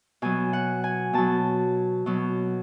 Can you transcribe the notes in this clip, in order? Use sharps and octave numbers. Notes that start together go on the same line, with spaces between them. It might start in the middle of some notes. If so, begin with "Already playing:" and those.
B2 F#3 G#5
F#5
G#5
B2 F#3 A5
B2 F#3